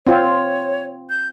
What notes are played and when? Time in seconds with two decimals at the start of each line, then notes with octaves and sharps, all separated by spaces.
0.07 C4 F4 C#5
1.10 G6